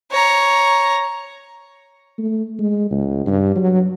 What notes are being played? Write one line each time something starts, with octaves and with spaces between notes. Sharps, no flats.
C#5 A#5
A3
G#3
C#2
G2
F#3